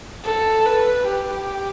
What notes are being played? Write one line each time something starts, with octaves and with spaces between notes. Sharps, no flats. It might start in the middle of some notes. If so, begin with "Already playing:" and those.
A4
B4
G4